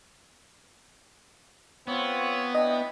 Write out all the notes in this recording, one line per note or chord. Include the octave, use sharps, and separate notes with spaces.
B3 C4 F4 C#5
D4 E4 D#5 G5